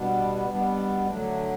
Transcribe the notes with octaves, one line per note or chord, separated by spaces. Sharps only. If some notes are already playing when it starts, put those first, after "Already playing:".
Already playing: B2 G3 B3 D4
B2 G3 B3 D4
D3 F#3 A3 D4